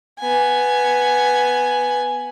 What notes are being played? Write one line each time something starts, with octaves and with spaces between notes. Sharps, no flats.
B3 G#5